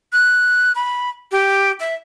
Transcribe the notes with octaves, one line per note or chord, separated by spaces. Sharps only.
F#6
B5
G4
E5